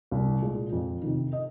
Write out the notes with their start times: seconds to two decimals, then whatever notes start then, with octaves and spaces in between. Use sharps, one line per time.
0.11 C2
0.41 A#2 G#3
0.72 F2
1.03 C3 D#3
1.33 D#5